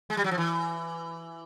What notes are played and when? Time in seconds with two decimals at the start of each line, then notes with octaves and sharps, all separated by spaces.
0.10 G#3
0.17 G3
0.24 F#3
0.31 F3
0.38 E3